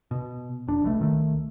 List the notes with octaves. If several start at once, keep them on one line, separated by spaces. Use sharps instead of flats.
B2
F1 D4
B1 B2 E3 A3
C#2 D#3 A3